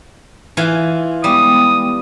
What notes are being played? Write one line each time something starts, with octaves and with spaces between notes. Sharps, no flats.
E3 F4 G#5
G3 G#3 B3 G5 D#6